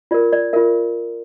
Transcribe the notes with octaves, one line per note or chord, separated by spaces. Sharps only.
F4 A#4 D5
D5
F4 A#4 E5